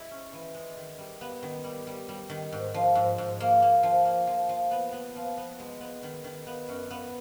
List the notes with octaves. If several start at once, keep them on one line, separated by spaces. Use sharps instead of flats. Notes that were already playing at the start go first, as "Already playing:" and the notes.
Already playing: G#3 E4
C#4
E3
G#3
D#3
G3
B3
D#3
G3
G3
G3
D#3
G#2
F3
G#2
G#2
A#3
A#3
F3
A#3
F3
F3
B3
B3
F3
B3
G#3
B3
D#3
D#3
B3
F#2
B3